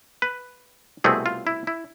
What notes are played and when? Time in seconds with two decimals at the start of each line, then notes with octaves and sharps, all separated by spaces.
0.22 B4
1.04 C2 B2 A3 C4 G#4
1.26 F4
1.47 E4
1.67 E4